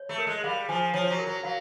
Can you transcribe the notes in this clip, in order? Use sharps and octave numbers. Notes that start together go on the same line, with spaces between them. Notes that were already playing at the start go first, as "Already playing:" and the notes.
Already playing: C#5
A3
A#4
G#3
G3 F5
F3 G#5
F3 C#5
F#3
A#4
F#3
F#3 F5